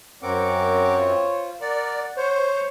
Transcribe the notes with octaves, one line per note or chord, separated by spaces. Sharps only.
F#2 C4 A#4 C#5 F#5 D6
F4 C5
A#4 D5 F#5
C5 C#5